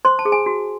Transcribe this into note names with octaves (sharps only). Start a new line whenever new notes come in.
C5 C6
A5
G#4
G#5
F#4